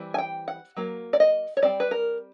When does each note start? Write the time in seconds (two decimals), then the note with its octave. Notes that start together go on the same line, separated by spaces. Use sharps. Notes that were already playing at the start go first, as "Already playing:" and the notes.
Already playing: E3 G3 C4
0.14 G#5
0.18 G5
0.48 F#5
0.77 F#3 A#3
1.13 D5
1.20 D#5
1.57 C#5
1.62 G3 C4 D#4 D5
1.80 B4
1.91 A#4